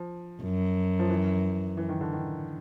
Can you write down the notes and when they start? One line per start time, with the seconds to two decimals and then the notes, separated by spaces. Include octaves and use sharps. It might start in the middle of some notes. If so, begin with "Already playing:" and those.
Already playing: F3
0.43 F#2
0.99 F3
1.09 E3
1.77 E3
1.89 D#3
2.01 D3
2.13 D#3